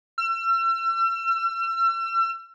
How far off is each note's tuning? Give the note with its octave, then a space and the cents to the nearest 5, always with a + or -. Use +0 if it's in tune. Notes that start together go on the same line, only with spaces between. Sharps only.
E6 +40